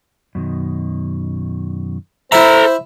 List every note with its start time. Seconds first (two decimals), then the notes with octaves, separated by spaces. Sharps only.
0.35 F#2 B2 D#3
2.32 E4 A4 C5 E5 A#5